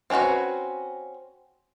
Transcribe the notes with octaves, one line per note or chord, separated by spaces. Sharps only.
C4 C#4 F4 F#4 B4